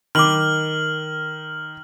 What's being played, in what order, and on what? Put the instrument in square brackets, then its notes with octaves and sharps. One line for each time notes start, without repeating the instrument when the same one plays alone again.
[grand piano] D#3 [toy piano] B5 D6 [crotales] F6 F#7